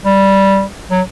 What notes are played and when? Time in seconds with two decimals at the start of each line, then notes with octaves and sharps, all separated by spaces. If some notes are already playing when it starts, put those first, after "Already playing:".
0.05 G3
0.91 F#3